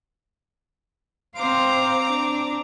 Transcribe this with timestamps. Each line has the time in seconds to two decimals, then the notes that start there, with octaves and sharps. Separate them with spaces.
1.36 C4 C5 F5 A#5 D6
2.07 D4